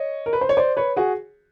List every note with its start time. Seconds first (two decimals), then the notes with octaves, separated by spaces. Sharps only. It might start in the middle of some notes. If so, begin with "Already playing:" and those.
Already playing: C#5 D#5
0.26 A#4
0.33 B4
0.41 C5
0.49 C#5
0.57 C5 D5
0.77 B4 C#5
0.96 F#4 G#4